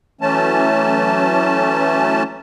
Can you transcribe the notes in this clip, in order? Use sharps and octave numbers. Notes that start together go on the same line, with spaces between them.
E3 F#3 A3 C#4 A5